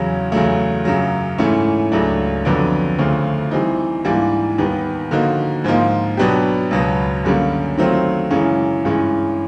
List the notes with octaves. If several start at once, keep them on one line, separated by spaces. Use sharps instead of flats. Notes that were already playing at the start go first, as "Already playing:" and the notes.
Already playing: E2 C#3 F#3
E2 C#3 F#3 A3
F#2 C#3 F#3
G#2 E3 A3 C#4 E4
C#2 C#3 F#3 A3 D4
F2 D3 F#3 B3 D4
D2 C#3 F3 A3
E3 G3 C4 D#4
G#2 E3 G3 A#3 D4
D#2 D#3 G3 B3
D3 F3 A#3 D#4 F#4
G#2 F3 A#3 D#4
B2 F#3 B3 D4 G4
C#2 B2 F#3 B3
F#2 D3 G3 A#3 C#4
D#3 F#3 A3 C4 F4
F#2 C#3 E3 G#3 C#4
G2 E3 G#3 C#4